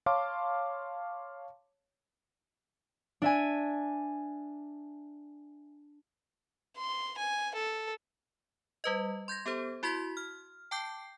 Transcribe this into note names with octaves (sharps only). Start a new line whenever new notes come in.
C#5 F5 A5 C6 D6
D4 E5 G#5
C6
G#5
A4
G3 B4 D#5
C6 G6 G#6 A#6
B3 G4 A4 C5
E4 F#4 C6 G#6 B6
F6
G5 A5 D6 G6 C7